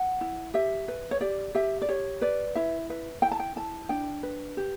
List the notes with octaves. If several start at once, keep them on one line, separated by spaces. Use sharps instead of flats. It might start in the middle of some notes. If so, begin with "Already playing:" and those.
Already playing: F#5
E4
G4 E5
B4
C#5
G4 D5
G4 E5
D5
G4 C#5
B4 D5
E4 E5
B4 E5
E4 G5
A5
G5
E4 A5
D4 G5
B4
G4